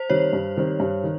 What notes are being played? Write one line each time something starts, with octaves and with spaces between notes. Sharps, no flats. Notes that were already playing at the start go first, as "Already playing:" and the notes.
Already playing: C5
D#3 G3 C4 C#5
G2
D#3 G3 C4
G2
D#3